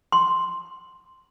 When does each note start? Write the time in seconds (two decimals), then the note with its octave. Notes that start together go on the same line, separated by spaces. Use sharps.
0.12 C6